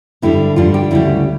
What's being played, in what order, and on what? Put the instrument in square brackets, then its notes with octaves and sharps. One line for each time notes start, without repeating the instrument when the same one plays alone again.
[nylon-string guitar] G2 D3 G3 D4 E4
G2 D3 G3 D4 F4
G4
D2 C#3 G3 E4